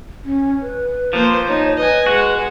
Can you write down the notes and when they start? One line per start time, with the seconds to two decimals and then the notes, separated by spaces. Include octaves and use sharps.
0.25 C#4
0.62 B4
1.13 F3 A#3 C5
1.47 D#4 C#5
1.77 B4 D#5 G#5
2.06 G#3 F#4 F#5